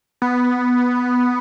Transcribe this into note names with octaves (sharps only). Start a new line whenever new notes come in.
B3